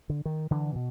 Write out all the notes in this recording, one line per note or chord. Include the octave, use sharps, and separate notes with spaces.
D3
D#3
D3 E3
B2